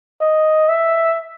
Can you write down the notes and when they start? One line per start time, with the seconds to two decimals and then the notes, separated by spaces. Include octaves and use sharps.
0.21 D#5
0.69 E5